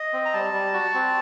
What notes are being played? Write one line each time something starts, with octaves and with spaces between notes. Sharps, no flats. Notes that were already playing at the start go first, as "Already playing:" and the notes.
Already playing: D#5
C4
A#5
G3 A5
G3
F#4
C4